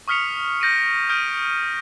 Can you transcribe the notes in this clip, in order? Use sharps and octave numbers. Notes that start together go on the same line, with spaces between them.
C#6 D#6 F6 B6 C#7 F7
G6 A#6 D7 D#7
D#6 F6 G6 D7 D#7